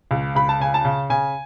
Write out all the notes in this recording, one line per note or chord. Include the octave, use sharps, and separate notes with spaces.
C#2
C#2 B5
A5
C#3 G#5
A5
C#3
C#3 G#5